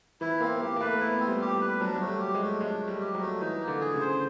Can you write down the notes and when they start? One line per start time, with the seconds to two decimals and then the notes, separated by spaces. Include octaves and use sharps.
0.21 E3 E4
0.41 A#3 C4
0.60 A#3 G4
0.76 A#3
0.81 A3 B4
1.00 B3 E4
1.20 C4
1.28 G3
1.41 G4
1.54 G3
1.61 B4
1.81 F#3 D4
1.96 F#3 A3
2.08 G3
2.20 G4
2.34 G#3
2.41 A3
2.60 G#3 D4
2.81 A3
2.88 G3
3.01 G4
3.14 F#3
3.20 A3
3.40 E3 D#4
3.60 A#3
3.68 D3
3.81 G#4
3.94 C#3
4.01 C5